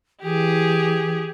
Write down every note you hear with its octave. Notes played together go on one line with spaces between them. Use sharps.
E3 G4 G#4